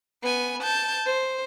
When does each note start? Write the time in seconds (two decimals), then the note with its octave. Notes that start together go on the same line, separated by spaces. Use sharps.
0.23 B3 G#5
0.63 A5 G6
1.06 C5